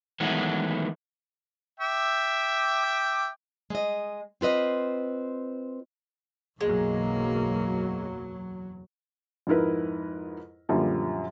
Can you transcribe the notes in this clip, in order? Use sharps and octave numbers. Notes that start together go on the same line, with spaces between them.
D#3 E3 F#3 G#3 A3 B3
E5 G5 D6
G#3 D#5
C4 F4 B4 D#5
F#1 B1 E2 F#3 G#3 A#3
F2 G#2 E4 A#4 B4
F#2 A#2 D3 F3 G3